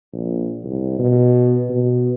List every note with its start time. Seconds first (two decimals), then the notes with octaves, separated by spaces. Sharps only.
0.13 A#1
0.65 C2
0.99 B2
1.70 B2